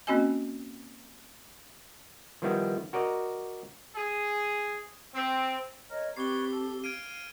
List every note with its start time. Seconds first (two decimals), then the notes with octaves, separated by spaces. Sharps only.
0.07 A#3 C4 C#4 F#4 D#5 G#5
2.42 D#3 F3 G3 B3 E4
2.93 F#4 A#4 D5 D#5
3.95 G#4
5.15 C4
5.90 A#4 C#5 D#5
6.17 C4 G4 B4 C#5 D5 C7 G7
6.52 A4
6.84 F5 G#6 D7 D#7